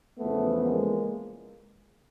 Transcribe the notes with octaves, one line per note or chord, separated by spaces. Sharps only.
E2 C#3 F3 A3 B3
G#3 A#3